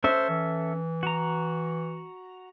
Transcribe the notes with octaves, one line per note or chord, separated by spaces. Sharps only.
C#4 A4 C5 E5
E3
F#4 A#5